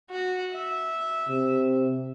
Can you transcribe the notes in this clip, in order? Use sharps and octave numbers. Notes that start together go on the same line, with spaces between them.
F#4
E5
C3